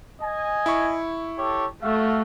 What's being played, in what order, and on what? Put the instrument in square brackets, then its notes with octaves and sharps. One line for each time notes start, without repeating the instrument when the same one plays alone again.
[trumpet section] D#5 G#5
[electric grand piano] E4 C#6
[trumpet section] G4 A4 C#5
[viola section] A3 [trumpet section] F#4 E5 F5